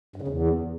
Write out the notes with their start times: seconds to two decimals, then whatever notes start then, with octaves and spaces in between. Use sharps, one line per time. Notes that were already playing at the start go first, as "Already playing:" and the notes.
0.16 G2
0.22 C#3
0.28 E2